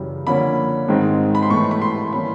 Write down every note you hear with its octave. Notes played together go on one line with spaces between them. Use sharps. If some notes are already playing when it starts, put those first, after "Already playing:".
Already playing: F#2 C#3 E3 G3
D3 F3 A#3 C#4 B5
G#2 D#3 G#3 C4
B5
C6
A2 E3 A3 C#6
B5
C6
E3 G3 A#3 C#4 B5